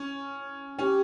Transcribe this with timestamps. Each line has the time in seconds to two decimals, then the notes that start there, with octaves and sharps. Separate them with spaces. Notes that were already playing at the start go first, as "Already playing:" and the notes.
Already playing: C#4
0.78 C#4 G4